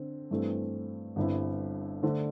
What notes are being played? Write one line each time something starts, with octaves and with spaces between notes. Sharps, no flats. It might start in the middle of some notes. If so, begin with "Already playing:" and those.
Already playing: D3 C4
G2 E3 A3 C4
G1 G2 D3 C4 E4
D3 A3 D4 C5